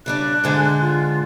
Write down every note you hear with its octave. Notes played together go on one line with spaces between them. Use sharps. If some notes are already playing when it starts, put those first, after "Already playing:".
C#3 G3 D4 F#6
G#2 D3 G#3
F4